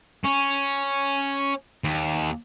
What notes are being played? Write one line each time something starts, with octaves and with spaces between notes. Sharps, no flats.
C#4
D#2